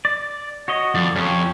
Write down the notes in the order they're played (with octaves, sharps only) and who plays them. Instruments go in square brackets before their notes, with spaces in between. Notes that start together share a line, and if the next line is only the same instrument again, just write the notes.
[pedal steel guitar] D5
F#4 C#5 D#5
[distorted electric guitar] F2 [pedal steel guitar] D5
[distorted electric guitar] F2 [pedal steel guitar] C#4 G4 C#5